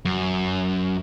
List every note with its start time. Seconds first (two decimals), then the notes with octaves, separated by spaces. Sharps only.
0.05 F#2